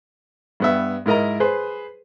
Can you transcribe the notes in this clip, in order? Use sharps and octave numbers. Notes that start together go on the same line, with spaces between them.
G2 B3 E5
G#2 E4 A#4 D#5 A#5
G#4 B4 C5